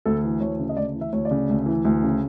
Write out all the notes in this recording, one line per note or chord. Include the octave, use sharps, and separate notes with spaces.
D2 A4
E3
D2 C#5
C#3
D#5
D2 D5
E3
E5
D2 C#5
D5
C#3
D2
E3
D2
C#3